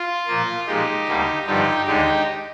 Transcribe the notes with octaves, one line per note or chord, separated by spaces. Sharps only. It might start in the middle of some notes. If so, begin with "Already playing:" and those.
Already playing: F4
A#2 F3 A#3
A#2 F3 G#3 D#4 G4
D2 D3 G3 A#3
G2 D3 F3 D#4 G4
D#2 D3 G#3 D#4 G4